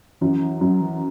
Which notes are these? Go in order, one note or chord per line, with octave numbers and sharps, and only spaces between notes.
F#2 E3
E3
F#2 F#3
E3